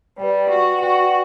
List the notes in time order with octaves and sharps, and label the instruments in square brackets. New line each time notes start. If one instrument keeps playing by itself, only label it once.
[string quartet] G3 [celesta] B4 D5 G5
[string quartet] F#4
[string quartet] F#4 [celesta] B4 D5 G5